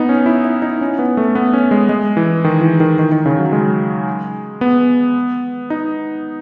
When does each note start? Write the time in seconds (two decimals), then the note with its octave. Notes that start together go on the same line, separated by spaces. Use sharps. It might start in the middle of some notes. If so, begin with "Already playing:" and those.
Already playing: B3 D#4
0.09 C#4
0.26 E4
0.45 E4
0.62 D#4
0.81 C#4
0.99 B3
1.17 A3
1.35 B3
1.53 C#4
1.71 G#3
1.89 G#3
2.17 E3
2.44 D#3
2.61 E3
2.80 D#3
2.99 D#3
3.12 D#3
3.26 C#3
3.39 F#3
3.52 G#3
4.61 B3
5.70 D#4